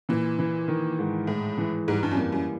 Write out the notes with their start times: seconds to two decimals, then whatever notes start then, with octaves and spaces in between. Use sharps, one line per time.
0.09 A#2 E3
0.39 E3
0.68 D#3
0.99 G#2
1.27 A2 G#3
1.58 E3
1.88 G#2 G3
2.03 G2
2.11 F#2
2.17 F2 A#3
2.32 F#2